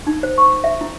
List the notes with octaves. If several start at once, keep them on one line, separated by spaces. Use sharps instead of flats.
D#4
C5
C#6
E5
E4